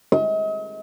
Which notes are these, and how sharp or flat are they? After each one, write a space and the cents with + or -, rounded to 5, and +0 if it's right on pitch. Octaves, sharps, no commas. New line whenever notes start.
D#5 +40